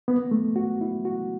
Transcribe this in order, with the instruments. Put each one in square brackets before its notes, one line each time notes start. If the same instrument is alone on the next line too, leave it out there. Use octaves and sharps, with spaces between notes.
[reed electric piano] B3
A3
F#4
E4
F#4